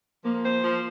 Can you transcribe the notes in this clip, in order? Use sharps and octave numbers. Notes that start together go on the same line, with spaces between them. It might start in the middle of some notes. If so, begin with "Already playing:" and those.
F3 A#3
C5
F3